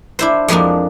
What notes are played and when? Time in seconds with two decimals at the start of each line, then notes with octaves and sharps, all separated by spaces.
0.19 D4 E4 C5
0.48 F2 F3 G#3 A#3 D4